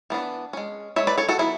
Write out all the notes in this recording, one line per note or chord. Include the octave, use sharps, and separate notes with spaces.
E3 B3 D4
G#3 C#4
G#3 C#4 C#5 E5
B4 D5
A4 C#5
F#4 A4
F#3 B3 E4 G#4